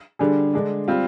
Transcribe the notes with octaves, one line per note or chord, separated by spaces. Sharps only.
D3 G3 D4 G#4
D3 G#3 D4
G3 C4 F4